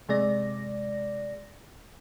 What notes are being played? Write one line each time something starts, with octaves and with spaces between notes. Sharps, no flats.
C3 G#3 D5 A#6